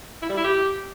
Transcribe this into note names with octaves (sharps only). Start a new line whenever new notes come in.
E4
G3
E4
G4